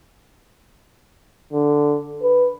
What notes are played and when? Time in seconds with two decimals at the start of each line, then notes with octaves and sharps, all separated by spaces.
1.53 D3
2.23 B4